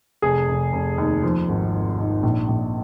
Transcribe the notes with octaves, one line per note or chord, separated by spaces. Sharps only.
F1 G#4
F1
F1
D#2
F3
G#1
G#2
G#2
A#1
A#1